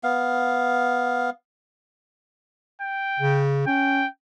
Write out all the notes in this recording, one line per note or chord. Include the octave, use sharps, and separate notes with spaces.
B3 F5
G5
C#3
C#4 G5